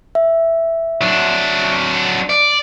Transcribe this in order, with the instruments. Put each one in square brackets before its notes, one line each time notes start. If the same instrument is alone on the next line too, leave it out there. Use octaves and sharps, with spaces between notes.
[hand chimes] E5
[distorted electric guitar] F#3 D4
D5